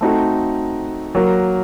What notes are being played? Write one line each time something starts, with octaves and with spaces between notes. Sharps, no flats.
A3 C4 D#4 F#4 A4
F#3 A#3 F#4 A#4